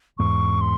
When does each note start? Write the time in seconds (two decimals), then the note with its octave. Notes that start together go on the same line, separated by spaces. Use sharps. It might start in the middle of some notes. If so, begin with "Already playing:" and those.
0.18 E2 G#2 C#6
0.61 C6